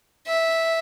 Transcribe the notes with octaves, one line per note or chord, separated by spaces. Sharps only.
E5